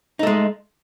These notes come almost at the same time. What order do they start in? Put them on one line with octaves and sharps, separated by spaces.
D#4 A3 G#3